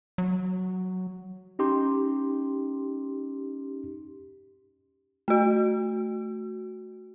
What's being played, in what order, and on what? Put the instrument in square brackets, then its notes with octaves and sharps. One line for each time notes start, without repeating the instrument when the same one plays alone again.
[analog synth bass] F#3
[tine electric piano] C#4 D#4 G4 C6
[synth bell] A3 F#4